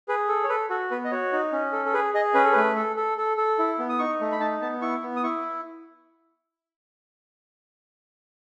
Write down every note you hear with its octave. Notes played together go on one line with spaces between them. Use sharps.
G#4 B4
A4
C#5
A4 B4
F#4 A4
B3 B4
D#5
F#4 C#5
D#4
C#4
A4
A4
G#4 B4
G#4 D#5
C#4 B4
A4
A3 B4
A4
A4
A4
A4
E4
B3
D#6
D#4 C#6
A3
B5
D#4 A5
B3 A5
E4 C#6
B3
D#6
E4 C#6